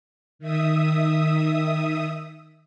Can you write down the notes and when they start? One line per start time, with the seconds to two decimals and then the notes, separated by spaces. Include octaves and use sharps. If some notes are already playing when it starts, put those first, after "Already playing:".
0.39 D#3 E5 D#6